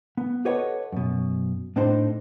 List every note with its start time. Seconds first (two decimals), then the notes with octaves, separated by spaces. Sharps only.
0.17 B3
0.45 G4 A4 B4 C#5 D#5 F#5
0.92 F#2 B2
1.76 A2 C4 D4 D#4 C5